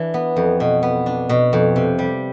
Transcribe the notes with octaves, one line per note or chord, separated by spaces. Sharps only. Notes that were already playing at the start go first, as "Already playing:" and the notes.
Already playing: E3 D4
B3
F2
B2
B3
D4
B2
F2
C3
G3